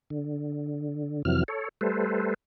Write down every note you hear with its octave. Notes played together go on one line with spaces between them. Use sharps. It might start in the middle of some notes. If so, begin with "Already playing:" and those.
D3
F2 C3 E3 F#3 F6
A4 C#5
G3 A3 A4 B4 C5